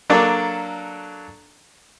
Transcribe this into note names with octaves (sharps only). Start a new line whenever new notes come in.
F#3 A#3 D4 A4 D5